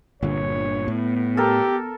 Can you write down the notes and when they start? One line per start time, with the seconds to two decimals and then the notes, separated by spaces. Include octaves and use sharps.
0.22 G1 A#2 D3 C#5
0.88 A2 B3
1.37 G4 A4 A#4